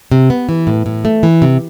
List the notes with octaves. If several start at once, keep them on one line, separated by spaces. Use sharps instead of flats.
C3
B3
E3
A2
A2
A3
E3
C3